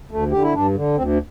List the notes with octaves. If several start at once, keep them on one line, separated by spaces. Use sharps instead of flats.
D2 A3
D3 G4
E4
G2 D4
D3
D2 C4